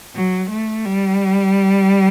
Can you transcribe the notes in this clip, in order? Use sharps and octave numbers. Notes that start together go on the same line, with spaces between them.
F#3
A3
G3